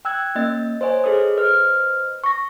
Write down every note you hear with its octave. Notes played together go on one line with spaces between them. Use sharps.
G5 E6 F#6 G#6
A#3 C#4 D#5 A6
C5 C#5 D#5 G#5
G#4 A4 B4 D#6
B4 C5 D#5 F6
C#6 A#6